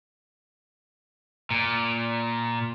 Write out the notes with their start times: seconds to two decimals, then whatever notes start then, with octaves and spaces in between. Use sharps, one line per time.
1.51 A#2